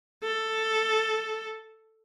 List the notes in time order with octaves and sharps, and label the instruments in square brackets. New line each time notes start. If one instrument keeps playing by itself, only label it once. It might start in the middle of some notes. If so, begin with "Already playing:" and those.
[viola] A4